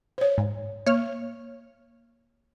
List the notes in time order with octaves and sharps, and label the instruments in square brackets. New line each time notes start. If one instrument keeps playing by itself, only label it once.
[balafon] C5 C#5
[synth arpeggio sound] G#2
[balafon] A#3 [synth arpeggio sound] C#5 F6